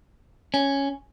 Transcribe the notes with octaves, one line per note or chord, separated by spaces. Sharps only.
C#4